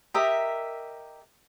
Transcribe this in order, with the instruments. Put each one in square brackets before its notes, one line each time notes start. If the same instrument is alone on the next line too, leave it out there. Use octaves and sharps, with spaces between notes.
[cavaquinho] G4 A#4 D#5 E5